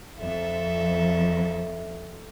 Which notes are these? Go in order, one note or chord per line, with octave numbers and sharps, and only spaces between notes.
F2 A4 E5